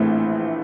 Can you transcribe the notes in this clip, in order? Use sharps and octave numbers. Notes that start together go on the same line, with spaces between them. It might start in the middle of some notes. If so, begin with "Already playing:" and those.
Already playing: A#1 A2 E3 A3 C4